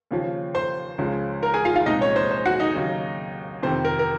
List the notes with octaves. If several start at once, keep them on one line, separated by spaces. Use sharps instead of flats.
D#2 C#3 F3
C5 C6
C#2 C#3 F3 G#3
A#4 A#5
G#4 G#5
F4 F5
F4 F5
C2 A#2 F3 G#3 D#4 D#5
C#4 C#5
C5
C5
F#4 F#5
D#4 D#5
D#2 C#3 F#3
F2 C3 D#3 C5
A#4
A#4